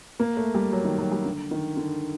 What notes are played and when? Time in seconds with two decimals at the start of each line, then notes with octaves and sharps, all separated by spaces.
0.20 A#3
0.37 A3
0.54 G3
0.72 F#3
0.85 D#3
0.98 F#3
1.12 G3
1.25 D3
1.51 D#3
1.77 D3